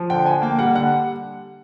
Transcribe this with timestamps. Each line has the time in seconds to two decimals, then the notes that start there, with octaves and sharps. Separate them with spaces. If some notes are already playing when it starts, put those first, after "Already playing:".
Already playing: F3
0.10 D3 G5
0.26 D3 G#5
0.42 A#3 G5
0.59 G3 F#5
0.75 D3 F#5